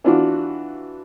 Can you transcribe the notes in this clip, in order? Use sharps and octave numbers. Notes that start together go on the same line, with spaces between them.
E3 D4 F4 F#4